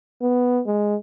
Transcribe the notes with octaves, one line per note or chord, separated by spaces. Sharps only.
B3
G#3